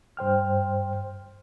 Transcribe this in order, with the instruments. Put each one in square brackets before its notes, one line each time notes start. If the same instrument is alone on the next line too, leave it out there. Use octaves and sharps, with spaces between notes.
[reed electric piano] G2 C5 G5 F6